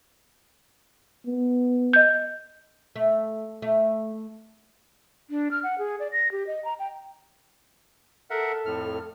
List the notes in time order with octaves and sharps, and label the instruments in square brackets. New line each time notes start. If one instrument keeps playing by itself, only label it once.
[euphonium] B3
[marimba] D#5 G6
[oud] A3
A3
[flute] D4
F6
F#5
G#4
D5
A#6
G4
D#5
A#5
G5
[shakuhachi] A4 [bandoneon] A#4 E5 F#5
[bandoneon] F2 A2 F6